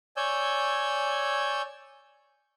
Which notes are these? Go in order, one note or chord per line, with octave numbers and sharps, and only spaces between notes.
C#5 D5 G#5 E6 G6